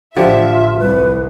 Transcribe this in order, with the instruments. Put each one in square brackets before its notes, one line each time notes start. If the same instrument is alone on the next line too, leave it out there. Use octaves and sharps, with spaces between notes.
[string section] A1 E5 [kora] D3 F3 G4 [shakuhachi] F4
[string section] C2 [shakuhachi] B4